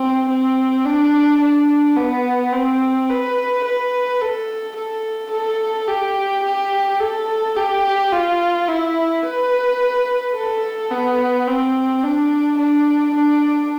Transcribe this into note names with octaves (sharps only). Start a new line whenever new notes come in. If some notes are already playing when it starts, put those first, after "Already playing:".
Already playing: C4
C4
D4
D4
B3
C4
B4
B4
A4
A4
A4
G4
G4
A4
G4
F4
E4
B4
A4
B3
C4
D4
D4
D4